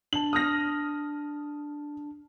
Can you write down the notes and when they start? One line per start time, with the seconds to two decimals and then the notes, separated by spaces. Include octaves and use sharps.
0.13 D4 A5 F#7
0.33 D#6 F6 A#6